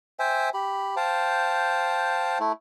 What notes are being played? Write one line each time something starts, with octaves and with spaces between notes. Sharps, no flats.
C5 E5 G5 G#5
G4 B5
C5 F5 G5 A5
A3 E4